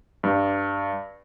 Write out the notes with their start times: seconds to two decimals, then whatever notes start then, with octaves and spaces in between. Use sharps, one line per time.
0.23 G2